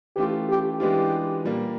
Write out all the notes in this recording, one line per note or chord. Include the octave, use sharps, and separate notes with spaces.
E3 A3 C#4 F4 G4
G4
E3 G#3 B3 D4 F4 G4
A#2 G3 A#3